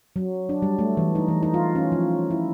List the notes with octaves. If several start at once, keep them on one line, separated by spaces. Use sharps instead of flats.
F#3
D4
G3
A3
E3
D#4
E3
D#4
F4
C#4
F3
E4